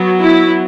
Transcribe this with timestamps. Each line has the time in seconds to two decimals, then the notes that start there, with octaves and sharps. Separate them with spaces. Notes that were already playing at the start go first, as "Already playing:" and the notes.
Already playing: F#3 B3
0.21 E4